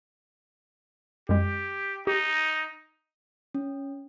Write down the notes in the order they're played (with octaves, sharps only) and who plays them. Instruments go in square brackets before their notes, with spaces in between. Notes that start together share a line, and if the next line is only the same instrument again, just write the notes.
[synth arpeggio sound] F#2 G#3 [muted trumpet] G4
[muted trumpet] D#4 [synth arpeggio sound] G4
[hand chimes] C#4